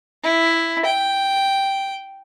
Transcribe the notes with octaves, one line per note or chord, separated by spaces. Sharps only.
E4
G5